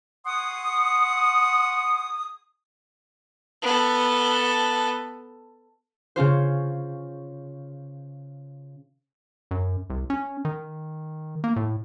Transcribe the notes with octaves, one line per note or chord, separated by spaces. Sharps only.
F#5 C6 C#6 D#6
B3 A4
C#3 C#4 F4 C5
F#2
C2
C#4
D#3
A#3
A2